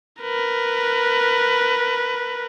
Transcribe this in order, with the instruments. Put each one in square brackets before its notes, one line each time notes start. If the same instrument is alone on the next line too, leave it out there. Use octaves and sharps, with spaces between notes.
[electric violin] A#4 B4